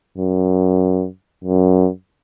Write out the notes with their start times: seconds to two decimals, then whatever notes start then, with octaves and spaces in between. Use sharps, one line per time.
0.18 F#2
1.44 F#2